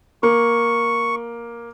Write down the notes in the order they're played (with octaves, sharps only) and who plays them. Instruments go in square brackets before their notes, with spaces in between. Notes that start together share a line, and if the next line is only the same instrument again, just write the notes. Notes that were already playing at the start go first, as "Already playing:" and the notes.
[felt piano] A#3 [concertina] C#6